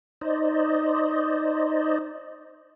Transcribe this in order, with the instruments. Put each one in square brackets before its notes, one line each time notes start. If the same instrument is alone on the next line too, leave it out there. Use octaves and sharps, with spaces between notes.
[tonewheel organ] D#4 C5 D5 D#5